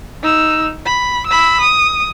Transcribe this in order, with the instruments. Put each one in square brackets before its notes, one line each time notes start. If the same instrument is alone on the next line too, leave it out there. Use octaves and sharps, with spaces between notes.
[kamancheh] D#4 E6
B5
B5 E6
D#6